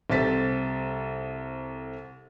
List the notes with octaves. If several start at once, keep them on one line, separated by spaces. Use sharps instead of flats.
C2 C4 A4 A6 B6